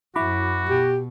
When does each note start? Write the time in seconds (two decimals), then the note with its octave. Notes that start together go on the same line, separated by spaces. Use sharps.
0.16 F#2 E4 F#4 B5 D6
0.69 B2 G4